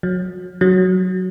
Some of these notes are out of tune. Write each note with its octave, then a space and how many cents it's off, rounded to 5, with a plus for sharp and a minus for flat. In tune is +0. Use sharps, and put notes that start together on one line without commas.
F#3 -25
F#3 +5